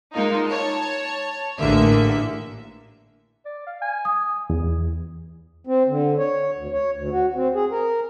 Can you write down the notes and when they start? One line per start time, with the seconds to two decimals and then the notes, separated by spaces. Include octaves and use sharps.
0.14 G#3 A#3 D#4 F4
0.47 C#5 A5
1.60 A1 D3 G#3 A#3 E5
3.46 D5
3.67 F5
3.82 G#5
4.05 D#6
4.50 E2
5.67 C4
5.88 D3
6.19 C#5
6.58 D2
6.72 C#5
6.96 D2
7.12 F#4
7.35 C4
7.55 G#4
7.71 A#4